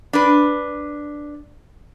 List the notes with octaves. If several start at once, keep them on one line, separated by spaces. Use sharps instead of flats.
D4 B4